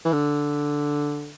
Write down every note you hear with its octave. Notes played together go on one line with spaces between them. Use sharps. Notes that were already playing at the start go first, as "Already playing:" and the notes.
E3
D3